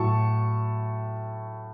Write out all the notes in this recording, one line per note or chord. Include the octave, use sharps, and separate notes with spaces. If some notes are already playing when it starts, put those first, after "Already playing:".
Already playing: A2 F#3 A5 C#6